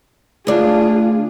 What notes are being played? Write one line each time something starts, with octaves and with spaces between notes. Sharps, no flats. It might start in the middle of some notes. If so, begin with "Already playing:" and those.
D2 D4 F4 G#4